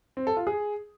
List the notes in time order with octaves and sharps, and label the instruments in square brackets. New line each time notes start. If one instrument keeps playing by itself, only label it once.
[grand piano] C4
A4
F4
G#4